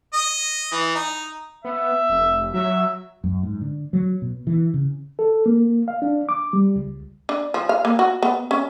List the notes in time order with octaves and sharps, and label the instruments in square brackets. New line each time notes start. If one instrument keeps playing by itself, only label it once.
[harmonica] D#5
E3
D#4
[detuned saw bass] B3 [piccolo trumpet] E5
[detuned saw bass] F1
[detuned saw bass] F#3 [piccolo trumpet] E5
[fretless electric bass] F#2
G#2
D3
F#3
B2
E3
C#3
[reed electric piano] A4
A#3
F5
D4
D6
G3
C#2
[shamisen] D4
F3
F5
A#3
F#4
B3
C#4